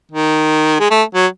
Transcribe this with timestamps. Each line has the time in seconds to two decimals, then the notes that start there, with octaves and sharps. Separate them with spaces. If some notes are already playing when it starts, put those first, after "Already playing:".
0.11 D#3
0.80 G#3
0.91 A3
1.15 F#3